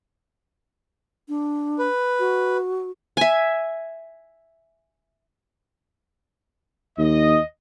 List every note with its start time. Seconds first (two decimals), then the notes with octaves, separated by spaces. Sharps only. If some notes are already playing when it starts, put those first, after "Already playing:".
1.29 D4
1.79 B4
2.20 F#4
3.17 E5 G#5
6.98 D#2 D#5